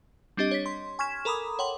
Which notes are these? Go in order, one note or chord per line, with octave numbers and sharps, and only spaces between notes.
G3 C4 D4 G4 D#5
C#5 B6
C6
G#5 C#6 F6 G#6 B6 E7
A4 A#4 A#5 B5 D6 D#6
C#5 F#5 G5 C6 F#7